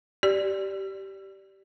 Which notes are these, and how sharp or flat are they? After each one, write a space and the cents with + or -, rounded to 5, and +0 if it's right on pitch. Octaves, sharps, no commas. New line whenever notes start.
G4 -15 D5 +0